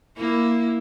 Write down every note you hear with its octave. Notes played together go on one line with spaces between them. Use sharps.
A#3 E4